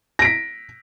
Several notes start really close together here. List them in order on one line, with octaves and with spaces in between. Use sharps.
A#6 D7 B6